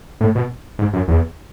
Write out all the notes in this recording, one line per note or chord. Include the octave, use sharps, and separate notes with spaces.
A2
B2
G#2
F#2
E2